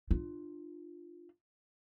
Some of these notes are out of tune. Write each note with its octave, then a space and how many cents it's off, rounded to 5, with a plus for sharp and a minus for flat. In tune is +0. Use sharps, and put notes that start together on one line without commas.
D4 +40 F4 +0